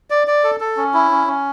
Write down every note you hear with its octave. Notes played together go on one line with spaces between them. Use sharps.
D5
D5
A4
A4
C#4
E4
C#4
C#4